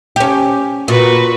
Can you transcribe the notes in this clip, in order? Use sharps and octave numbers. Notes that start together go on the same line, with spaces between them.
C#4 G4
A#2 F#4 B4